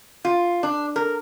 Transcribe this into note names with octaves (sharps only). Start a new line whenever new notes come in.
F4
D4
A#4